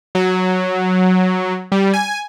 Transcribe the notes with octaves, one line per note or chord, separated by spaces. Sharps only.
F#3
G3
G#5